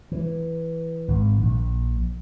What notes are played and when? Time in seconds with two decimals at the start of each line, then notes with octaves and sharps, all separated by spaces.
0.12 E3
1.08 G#1
1.42 A#1